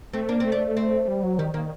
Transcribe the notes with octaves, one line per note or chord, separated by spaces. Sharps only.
A3 C4
A#3 D4
A3 C4
D4
C4
G3
F#3
D#3 G3
D#3 A#3